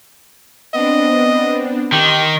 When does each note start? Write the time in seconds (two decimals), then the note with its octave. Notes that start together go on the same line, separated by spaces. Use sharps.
0.74 B3 C4 D4 D#5
1.92 D#3 G4 C6 D#6